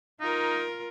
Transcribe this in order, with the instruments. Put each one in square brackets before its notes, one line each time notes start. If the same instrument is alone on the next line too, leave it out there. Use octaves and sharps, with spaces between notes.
[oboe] D#4 [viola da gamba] F4 A#4